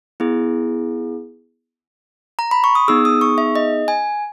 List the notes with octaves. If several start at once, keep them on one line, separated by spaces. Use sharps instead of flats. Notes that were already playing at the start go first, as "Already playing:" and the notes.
B3 E4 G#4
A#5
B5
C#6
D#6
B3 D#4 G#4 E6
D#6
C#6
E5
D#5
G#5